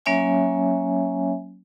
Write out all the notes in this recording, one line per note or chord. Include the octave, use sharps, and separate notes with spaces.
F#3 A#3 C#4 C#5 E5 G#5